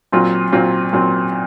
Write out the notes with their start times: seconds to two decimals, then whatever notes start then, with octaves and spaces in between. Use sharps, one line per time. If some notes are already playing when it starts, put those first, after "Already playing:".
0.12 A#2 F#3 C4 F4
0.52 A#2 F#3 C4 F4
0.93 A#2 F#3 C4 F4